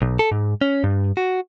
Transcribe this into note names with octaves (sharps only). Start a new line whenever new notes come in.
B1
A4
G#2
C#4
G2
F#4